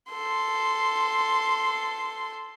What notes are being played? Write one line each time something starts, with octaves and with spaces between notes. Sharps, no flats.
A4 C6